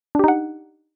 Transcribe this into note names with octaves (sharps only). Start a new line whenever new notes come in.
D4 D#4 G4 F#5